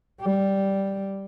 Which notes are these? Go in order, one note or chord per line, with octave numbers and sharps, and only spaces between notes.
G3